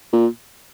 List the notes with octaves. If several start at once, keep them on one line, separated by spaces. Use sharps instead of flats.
A#2